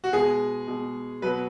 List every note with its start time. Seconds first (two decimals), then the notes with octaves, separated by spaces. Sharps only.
0.04 F#4
0.13 B2 G#3 G#4
0.67 B2 G#3
1.22 B2 F#3 B4